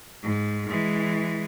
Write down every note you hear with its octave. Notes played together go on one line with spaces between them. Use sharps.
G#2
E3 G#3